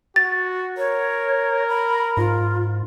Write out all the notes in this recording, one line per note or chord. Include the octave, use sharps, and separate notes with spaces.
F#4 A6
A#4 C#5
B5
G#2 F4